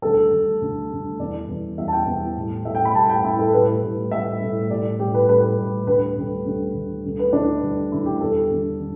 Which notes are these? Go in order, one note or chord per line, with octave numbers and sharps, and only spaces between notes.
D2 D3 G3 A4
D2 D3 G3
D2 D3 G3
D2 D3 G3
E2 E3 G3 D5
E2 E3 G3
E2 E3 G3 E5
A5
G5
E2 E3 G3
A2 G3
A2 G3 E5
G5
B5
A2 G3 A5
G5
A2 G3 E4
A4
A2 G3 B4
A2 G3
A2 G3 E5
A2 G3
A2 G3 D5
A2 G3 G4
B4
A2 G3 B4
A2 G3
D2 D3 G3 B4
D2 D3 G3
D2 D3 G3
D2 D3 G3
D2 D3 G3
B4
D2 D3 G3 D4
D2 D3 G3
D2 D3 G3 E4
G4
E2 D3 G3 A4
E2 D3 G3
D3 G3